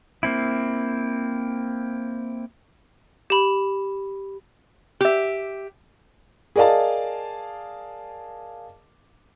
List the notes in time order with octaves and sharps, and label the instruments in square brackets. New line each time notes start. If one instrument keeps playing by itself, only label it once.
[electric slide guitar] A#3 C4 E4
[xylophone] G4 B5
[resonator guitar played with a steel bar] G4 E5
[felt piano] G#4 A#4 D5 D#5 F5 A5